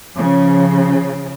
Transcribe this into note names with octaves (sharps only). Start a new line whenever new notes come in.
C#3 F3